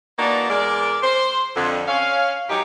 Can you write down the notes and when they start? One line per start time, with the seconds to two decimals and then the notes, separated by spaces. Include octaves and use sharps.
0.19 E3 A#3 D4 D#4 F#4 D5
0.50 E2 G#3 A#4 D5
1.03 C5
1.56 F2 D3
1.88 C#4 F5
2.49 G#2 F#3 D#4 G4